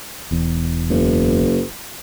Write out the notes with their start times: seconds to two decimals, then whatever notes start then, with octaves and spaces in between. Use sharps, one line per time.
0.31 E1 E2
0.90 F#1